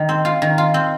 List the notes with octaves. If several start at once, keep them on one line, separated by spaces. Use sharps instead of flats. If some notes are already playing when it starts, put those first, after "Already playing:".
Already playing: D#3
C4
F4
D#3
F4
C4